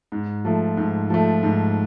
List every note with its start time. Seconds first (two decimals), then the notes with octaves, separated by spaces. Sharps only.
0.12 G#2
0.45 F3 A3
0.77 G#2
1.10 F3 A3
1.43 G#2